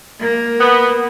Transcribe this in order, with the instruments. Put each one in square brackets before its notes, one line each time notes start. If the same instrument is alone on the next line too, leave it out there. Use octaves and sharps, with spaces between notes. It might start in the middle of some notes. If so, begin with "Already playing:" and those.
[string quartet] A#3
[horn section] B3